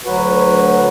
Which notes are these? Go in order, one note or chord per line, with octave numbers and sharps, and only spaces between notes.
D2 F#3 F#4 B4